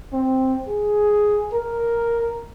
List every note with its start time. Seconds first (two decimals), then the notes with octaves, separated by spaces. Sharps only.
0.13 C4
0.68 G#4
1.54 A#4